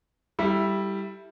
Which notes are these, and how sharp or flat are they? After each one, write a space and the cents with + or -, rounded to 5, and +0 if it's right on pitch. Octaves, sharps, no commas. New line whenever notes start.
G3 +0 E4 +0 A4 +0